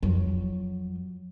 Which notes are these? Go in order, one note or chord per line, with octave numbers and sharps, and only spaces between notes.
F2 F#3